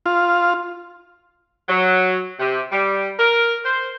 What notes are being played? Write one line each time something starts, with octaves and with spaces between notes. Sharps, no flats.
F4
F#3
C3
G3
A#4
C5